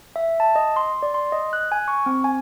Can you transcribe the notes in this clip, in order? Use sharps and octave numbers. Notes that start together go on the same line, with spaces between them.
E5
A5
D#5
C6
D5
C6
D#5
F#6
G#5
C#6
C4
G#5